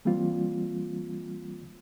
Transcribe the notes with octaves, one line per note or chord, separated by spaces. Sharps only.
E3 G3 A#3 C4 F4